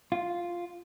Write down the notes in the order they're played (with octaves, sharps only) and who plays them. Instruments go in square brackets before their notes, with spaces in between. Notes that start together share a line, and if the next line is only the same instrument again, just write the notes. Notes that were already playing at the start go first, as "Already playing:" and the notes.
[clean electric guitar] F4